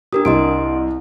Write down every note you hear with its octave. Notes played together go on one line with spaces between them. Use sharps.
D4 G4 A#4 D#6
C2 D#5 C6 D7